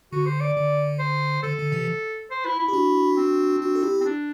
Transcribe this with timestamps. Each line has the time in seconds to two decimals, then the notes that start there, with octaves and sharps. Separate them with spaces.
0.12 D3 F#4
0.26 C5
0.41 D5
0.56 D3
0.99 C5
1.43 D3 A4
1.58 D3
1.72 C3 E3
2.31 C5
2.45 E4
2.59 E4
2.68 G4
2.73 D4 F#4
3.17 C4
3.61 D4 F#4
3.75 A4
3.83 E4 G4
4.01 C4
4.05 D4